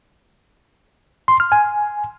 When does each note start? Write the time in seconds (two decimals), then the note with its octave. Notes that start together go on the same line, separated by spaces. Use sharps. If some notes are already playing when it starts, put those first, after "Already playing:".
1.28 C6
1.40 F6
1.52 G#5